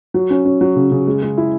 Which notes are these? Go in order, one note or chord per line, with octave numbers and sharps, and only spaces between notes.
F#3
C#4
C#4
F#3
C#3
C#3
G#3
G#3
E4